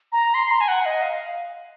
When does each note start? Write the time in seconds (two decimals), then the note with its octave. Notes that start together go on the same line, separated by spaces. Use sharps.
0.12 A#5
0.34 C6
0.51 A#5
0.61 G#5
0.68 F#5
0.86 D#5
1.02 F5